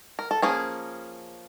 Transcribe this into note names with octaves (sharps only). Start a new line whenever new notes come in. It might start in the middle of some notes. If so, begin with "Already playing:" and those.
A#4
A4
F3 A#3 C#4 G#4